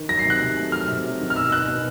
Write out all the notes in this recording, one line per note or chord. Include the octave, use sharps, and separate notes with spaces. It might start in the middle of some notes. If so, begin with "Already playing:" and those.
Already playing: D#3
F#3 A#6
C7
C3
F#6
C3
A3
F#3 F6
C3
F#3
D#3
F6
B2 E6
B2 F#6
B2